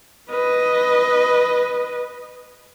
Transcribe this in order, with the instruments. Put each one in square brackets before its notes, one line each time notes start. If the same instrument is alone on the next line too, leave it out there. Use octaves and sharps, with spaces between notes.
[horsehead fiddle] B4 D#5